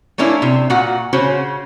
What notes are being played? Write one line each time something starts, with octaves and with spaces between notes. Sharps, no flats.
A3 A#3 C#4 D4 E4
C3
A#2 F#4 F#5
C#3 C#4 F#4 C5